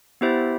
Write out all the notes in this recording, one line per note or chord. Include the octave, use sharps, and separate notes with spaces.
B3 E4 G4 C5 E5